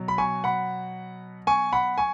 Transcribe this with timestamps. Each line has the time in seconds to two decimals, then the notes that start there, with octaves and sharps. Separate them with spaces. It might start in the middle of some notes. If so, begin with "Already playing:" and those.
Already playing: B2 F#3
0.08 B5
0.18 G#5 C#6
0.44 F#5 B5
1.47 G#5 C#6
1.73 F#5 B5
1.98 G#5 C#6